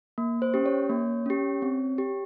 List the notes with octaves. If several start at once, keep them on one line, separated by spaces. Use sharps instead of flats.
A#3
C5
C#4 G4
C#5
A#3
C#4 G4
C4
G4